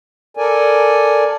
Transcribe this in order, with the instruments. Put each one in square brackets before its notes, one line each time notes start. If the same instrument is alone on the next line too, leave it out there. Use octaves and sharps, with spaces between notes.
[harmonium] A4 A#4 D5 G#5